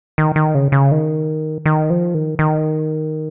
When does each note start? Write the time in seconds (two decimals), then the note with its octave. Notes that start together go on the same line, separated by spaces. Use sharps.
0.18 D#3
0.36 D#3
0.55 C#3
0.72 C#3
0.91 D#3
1.66 D#3
1.90 F3
2.14 D#3
2.39 D#3